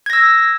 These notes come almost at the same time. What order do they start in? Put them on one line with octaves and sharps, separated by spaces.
G#6 A#6 E6